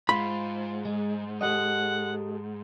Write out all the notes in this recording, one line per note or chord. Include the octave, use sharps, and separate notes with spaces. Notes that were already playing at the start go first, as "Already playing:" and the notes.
G#2 F4 B5
G#3
G4 A4 D#5 F#5